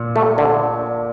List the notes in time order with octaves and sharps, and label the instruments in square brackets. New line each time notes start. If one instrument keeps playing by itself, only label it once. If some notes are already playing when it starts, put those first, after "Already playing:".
Already playing: [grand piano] A#2
[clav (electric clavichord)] A3
D3